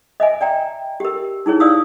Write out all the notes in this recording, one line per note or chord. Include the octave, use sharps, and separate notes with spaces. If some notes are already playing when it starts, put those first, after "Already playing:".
D#5 E5 G#5
D5 G5 A#5
G4 A#4
D#4 E4 G#4 C#5
D5 F5 D#6 E6